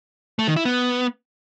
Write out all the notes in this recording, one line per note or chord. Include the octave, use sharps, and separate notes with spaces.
A3
D#3
E4
B3